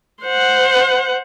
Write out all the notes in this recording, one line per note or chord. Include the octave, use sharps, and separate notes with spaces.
C5 F#5